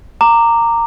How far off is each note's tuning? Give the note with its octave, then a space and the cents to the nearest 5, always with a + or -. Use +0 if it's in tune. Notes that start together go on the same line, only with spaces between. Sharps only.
A#5 -15 D6 +10